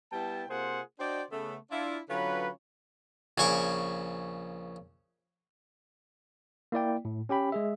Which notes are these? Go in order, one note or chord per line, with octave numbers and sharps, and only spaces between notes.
G3 B3 E4 G5 A5
C3 A#3 F4 G#4 C5 F#5
D4 F#4 C5 D5 D#5 G5
C#3 A3 B3
D4 E4 F4
D3 F#3 C#4 F4 B4
A#1 C#3 G#5 C#6 D6
A#3 E4 D5 G5
A2
C#4 G4 G5 B5
G#3 G#4 E5